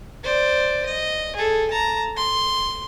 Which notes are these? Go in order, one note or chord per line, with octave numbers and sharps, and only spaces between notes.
C5 D5
D#5
G#4 A4
A5 A#5
C6